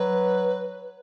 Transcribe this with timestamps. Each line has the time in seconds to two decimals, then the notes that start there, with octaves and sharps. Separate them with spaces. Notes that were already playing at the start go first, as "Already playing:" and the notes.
Already playing: F#3 B4